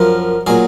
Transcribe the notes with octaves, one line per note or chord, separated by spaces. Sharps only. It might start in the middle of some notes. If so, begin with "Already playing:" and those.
Already playing: F#2 F3 A#4
A#2 F#3 G#4